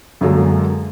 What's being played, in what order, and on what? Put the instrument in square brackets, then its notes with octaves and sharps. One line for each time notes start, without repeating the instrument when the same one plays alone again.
[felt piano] F#2 D3 F#3 G#3 A#3